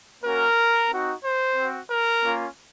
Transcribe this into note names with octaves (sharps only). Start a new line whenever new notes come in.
A#3 C#4 F#4 A#4
C4 D#4 F#4
C5
C4 F#4
A#4
A#3 C#4 F4